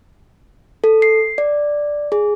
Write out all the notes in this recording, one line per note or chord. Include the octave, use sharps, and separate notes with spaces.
A4
C7
D5
G#4